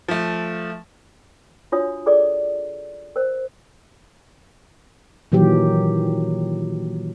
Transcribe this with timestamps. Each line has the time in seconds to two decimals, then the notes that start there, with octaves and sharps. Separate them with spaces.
0.08 F3 A3
1.72 D4 F4 F#4 C#5 D#6
2.06 F4 G#4 A4 D5 D6
3.16 A#4 C5
5.32 A#2 D#3 E3 F#3 G4